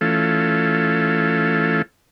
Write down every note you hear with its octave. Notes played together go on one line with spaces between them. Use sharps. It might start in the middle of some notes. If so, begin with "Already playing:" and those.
E3 A3 C#4 F4 A4